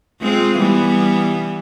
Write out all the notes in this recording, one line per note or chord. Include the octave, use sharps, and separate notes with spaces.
G#3 C4 F4
E3 G3 B3